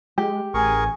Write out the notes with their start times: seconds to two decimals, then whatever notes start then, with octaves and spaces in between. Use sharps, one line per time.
0.18 G#3 G4
0.54 A1 G#4 A#4 G#5 C#6